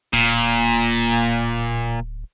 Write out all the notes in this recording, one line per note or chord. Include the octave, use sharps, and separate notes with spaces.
D1 A#2